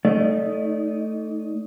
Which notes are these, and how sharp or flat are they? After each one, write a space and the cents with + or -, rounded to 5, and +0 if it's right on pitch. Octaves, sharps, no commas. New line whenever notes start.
A3 +0 D#4 +0 D5 -30